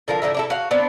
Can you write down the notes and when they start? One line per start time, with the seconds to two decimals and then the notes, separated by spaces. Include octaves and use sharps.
0.08 D3 F3 A#4 F5
0.22 A2 D3 A#4 E5
0.34 D4 E4 A4
0.50 F#4 F5
0.71 B3 C4 D4